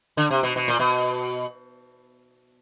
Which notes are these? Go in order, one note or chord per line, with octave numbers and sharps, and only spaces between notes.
D3
C3
B2
B2
A#2
B2